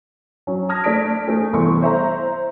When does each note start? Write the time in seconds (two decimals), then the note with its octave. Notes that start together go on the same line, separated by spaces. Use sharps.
0.47 F#3 C#4
0.69 A5 D#6 F6 G#6 A#6
0.84 A3 D4 A5 B6 D7
1.27 A3 G#4
1.53 C2 E3 B3 A4 C6 C#6
1.82 C5 E5 A#5